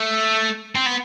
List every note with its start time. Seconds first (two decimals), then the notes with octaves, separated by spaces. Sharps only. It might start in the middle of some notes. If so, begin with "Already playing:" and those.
Already playing: A3
0.75 C4
0.86 B3